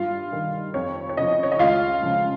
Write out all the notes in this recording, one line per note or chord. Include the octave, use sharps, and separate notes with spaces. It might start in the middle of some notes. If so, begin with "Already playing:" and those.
Already playing: G2 F4 F5
D#3
F2 C#5
C#5
C#3 F3 D#5
C#5
D#5
C#2 F4 F5
C#3 F3